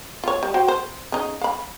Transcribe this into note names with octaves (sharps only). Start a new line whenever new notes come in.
F4 C#5
G3
F#4 C5 G5
C5
C#3 D#4
F5 B5